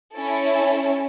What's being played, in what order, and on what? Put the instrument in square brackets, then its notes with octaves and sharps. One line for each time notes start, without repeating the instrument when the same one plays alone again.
[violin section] C#4 E4 A4